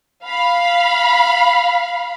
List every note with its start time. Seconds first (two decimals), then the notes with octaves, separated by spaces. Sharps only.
0.24 F5 B5